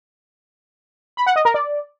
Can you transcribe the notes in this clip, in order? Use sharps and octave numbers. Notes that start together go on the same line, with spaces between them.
B5
F#5
D#5
A#4
D5